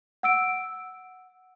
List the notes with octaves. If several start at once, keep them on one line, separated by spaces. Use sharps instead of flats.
F#5 E6 D7